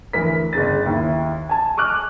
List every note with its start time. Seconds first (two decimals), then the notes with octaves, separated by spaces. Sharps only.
0.13 D2 E3 A#4 B6
0.53 G1 C#3 A6
0.86 D#2 E4
1.49 G#5 A5
1.77 C#6 D6 F6 F#6